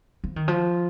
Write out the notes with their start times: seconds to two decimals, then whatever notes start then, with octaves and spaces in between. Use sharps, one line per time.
0.24 F3
0.36 D#3
0.48 F3